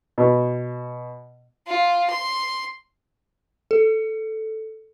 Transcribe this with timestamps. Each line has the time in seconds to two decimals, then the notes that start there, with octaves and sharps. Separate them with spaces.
0.18 B2
1.67 F4
2.11 C6
3.71 A4